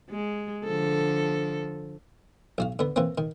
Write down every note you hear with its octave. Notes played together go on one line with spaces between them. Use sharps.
G#3
D3 F3 A4
B1 F#4 F5
D3 B3
E3 A#3 C4
D#3